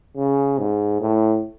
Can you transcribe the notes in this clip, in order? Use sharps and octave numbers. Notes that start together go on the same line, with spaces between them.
C#3
G#2
A2